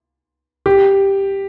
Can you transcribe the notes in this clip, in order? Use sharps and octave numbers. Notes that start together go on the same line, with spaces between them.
G4